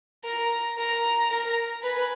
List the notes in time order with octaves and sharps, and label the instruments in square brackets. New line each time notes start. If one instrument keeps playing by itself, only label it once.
[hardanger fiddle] A#4 [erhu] A#5
[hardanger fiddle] A#4 [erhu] A#5
[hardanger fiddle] A#4
[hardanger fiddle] B4 [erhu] G#5